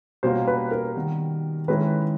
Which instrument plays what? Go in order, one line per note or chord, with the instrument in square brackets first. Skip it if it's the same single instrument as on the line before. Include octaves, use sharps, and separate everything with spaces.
[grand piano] B2 G3 A#3 C#4 F4 [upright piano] C5
[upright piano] B4
A#4
[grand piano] D#3 G3 B3
[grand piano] D#3 G#3 C#4 E4 [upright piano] B4